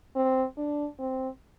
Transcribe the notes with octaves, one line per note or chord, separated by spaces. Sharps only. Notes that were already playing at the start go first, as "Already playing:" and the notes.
C4
D4
C4